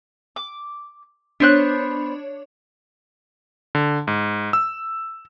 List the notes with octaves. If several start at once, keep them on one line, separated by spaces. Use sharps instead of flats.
D6
B3 D4 C5 C#5 F#6
D3
G#2
E6